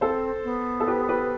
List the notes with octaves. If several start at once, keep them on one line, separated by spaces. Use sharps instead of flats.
C4 A4 C5
B3
A4
G4 B4
G4 B4